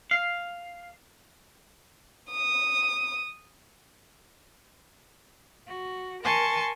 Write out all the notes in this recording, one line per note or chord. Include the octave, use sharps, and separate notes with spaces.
F5
D#6
F#4
A#4 G#5 A5 C6 C#6